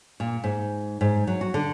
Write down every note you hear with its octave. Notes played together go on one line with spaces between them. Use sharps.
A#2
G#2
G#2
F#3
F#4
D3